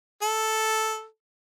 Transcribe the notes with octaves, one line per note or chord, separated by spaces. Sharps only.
A4